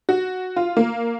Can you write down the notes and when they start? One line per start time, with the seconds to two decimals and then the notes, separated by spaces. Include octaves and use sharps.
0.09 F#4
0.56 F4
0.77 A#3